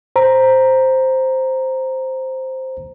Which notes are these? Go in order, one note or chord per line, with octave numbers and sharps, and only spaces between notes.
C5 A#5